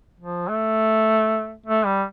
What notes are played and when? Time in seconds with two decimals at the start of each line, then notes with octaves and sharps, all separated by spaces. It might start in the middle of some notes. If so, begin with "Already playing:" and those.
0.20 F3
0.49 A3
1.66 A3
1.86 G3